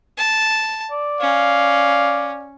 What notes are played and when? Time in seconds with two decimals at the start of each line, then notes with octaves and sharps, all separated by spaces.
0.17 A5
0.91 D5
1.21 C#4 F5